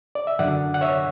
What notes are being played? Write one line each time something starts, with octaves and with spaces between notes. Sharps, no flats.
D5
E5
F#2 D3 D5 F#5
F#5
C#5 E5